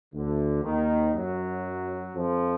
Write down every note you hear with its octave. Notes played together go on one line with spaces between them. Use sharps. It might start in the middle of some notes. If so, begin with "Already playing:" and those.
D2 D3
D#2 D#3
F#2 F#3
F2 F3